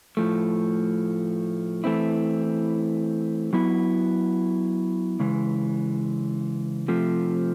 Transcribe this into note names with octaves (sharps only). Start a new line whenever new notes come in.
A2 F3 A3
E3 A3 C4 E4
F#3 B3 E4
C#3 E3 G#3
C3 F3 A3